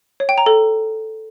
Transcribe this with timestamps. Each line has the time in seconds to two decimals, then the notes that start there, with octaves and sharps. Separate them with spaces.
0.20 C#5
0.29 G5
0.38 A#5
0.46 A4